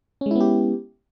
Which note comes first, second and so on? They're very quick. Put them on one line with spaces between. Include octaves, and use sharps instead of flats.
C#4 G#3 E4 B3 G4